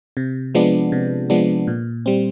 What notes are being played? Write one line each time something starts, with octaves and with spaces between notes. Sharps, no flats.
C3
F3 G#3 B3 D4
C3
F3 G#3 B3 D4
A#2
G3 C4